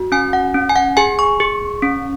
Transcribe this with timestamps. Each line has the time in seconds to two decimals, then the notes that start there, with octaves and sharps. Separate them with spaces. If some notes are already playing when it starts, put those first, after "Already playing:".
Already playing: F#4
0.12 C#4 G#5
0.33 F#5
0.54 C#4
0.69 G#5
0.76 F#5
0.97 G#4 G#5
1.19 C#6
1.40 G#4
1.82 C#4